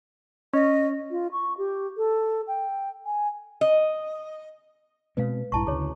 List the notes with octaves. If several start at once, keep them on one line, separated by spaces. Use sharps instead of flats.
C#4 D#5
F4
C#6
G4
A4
G5
G#5
D#5
B2 G#3 C4 B4 F5
A#1 G2 E4 A5 C#6
D2 C#3 G#4 C#5